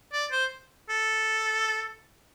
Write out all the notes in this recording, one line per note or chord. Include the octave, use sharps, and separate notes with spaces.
D5
C5
A4